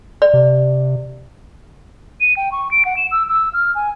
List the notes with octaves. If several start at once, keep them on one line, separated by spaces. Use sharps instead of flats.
D5
C3
D#7
G5
C#6
D7
F#5
E7
E6
E6
F6
G#5